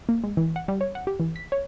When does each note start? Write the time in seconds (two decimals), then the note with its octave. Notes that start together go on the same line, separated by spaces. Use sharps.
0.09 A#3
0.24 G#3
0.37 E3
0.56 F#5
0.68 G3
0.81 C#5
0.95 F#5
1.07 G4
1.20 E3
1.36 B6
1.52 C#5